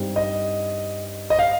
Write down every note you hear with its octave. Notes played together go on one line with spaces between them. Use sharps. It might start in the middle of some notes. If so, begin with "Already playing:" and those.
Already playing: G2 G3 C4 D#4
D#5
D#5
F5